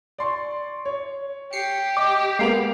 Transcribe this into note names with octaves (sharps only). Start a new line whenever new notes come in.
D5 C6 C#6
C#5
G4 C7 C#7
D#5 D6
G#3 A#3 B3 C7 D7 F7